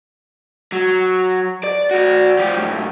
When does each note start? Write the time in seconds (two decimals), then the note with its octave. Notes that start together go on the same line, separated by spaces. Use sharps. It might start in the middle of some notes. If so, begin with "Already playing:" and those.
0.72 F#3
1.64 D5
1.91 F#4 D5
2.39 F3 G4
2.55 F#2 A2